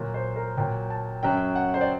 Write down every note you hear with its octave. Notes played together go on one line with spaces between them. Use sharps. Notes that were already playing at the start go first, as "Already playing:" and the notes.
Already playing: A#2 F#3
C5
A#4
A#2 F#3 G5
A5
F#2 F#3 G5
F#5
C5
D5